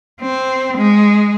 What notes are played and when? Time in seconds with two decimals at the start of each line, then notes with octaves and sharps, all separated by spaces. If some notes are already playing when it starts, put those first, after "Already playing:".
0.21 C4
0.77 G#3